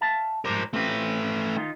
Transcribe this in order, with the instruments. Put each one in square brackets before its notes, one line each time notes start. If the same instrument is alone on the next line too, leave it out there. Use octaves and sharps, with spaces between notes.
[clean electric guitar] E5 F5 A5
[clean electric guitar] G#2 F3 G3 [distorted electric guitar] A#4 C5
[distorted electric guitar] A3 B4 [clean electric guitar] C4 F4 G4
[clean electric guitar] D#3 D#4 F4